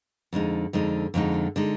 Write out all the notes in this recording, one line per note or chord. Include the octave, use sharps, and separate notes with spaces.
F2 D3 G#3 D#4
F2 D3 G#3 D#4
F2 D3 G#3 D#4
D3 G#3 D#4